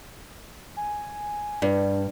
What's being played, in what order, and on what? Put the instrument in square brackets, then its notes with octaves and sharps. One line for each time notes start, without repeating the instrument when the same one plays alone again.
[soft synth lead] G#5
[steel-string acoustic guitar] G2 [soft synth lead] D4